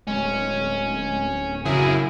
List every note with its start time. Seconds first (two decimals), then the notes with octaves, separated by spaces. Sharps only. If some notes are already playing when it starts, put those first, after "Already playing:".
0.07 D1 G#3 C#4
1.66 F#2 C#3 E4 G#4 A#4